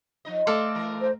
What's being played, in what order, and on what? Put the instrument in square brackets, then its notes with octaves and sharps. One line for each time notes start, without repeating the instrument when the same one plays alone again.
[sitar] F3 D#4 D#5
[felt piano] A3 [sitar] C4 [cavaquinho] A4 D5 F5
[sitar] E3 A#4
[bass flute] C5